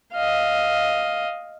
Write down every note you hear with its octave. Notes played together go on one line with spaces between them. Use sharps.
D#5 F5